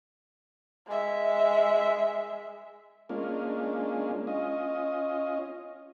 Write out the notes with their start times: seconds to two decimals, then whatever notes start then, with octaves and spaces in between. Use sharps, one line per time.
0.88 G#3 E5
3.09 G#3 A#3 C#4 D4 F4
4.27 C#4 F4 D#5